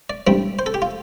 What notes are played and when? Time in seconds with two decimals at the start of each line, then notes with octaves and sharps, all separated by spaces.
0.10 D5
0.27 A1 G2 G3 C4
0.59 C5
0.66 A4
0.74 G4
0.82 F4